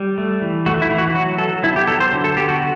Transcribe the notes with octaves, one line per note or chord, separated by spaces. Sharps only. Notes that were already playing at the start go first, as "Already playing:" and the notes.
Already playing: G3
A3
E3
A3 F#4
E4
E3
F#4
F#3 F#4
F#3 A4
B3 E4
G4
F#3 A4
C5
D3
A4
B3 G4
F#4